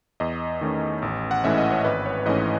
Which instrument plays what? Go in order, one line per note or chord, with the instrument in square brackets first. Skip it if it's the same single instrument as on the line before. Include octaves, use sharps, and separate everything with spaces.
[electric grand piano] E2 D#5
D#3 A3 C#4
A1
F#5
G#2 E3 A3 C#4 E5
D#5
C#5
G#1 B4
C#5
G#2 E3 A3 C#4 D#5